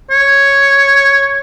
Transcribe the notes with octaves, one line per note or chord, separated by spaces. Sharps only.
C#5